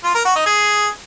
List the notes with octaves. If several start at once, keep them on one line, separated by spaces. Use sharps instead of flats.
F4
A#4
F#4
D#4
G#4